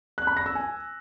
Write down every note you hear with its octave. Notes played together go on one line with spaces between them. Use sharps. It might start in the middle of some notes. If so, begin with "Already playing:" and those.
F#6
B5
A#6
E6
G#5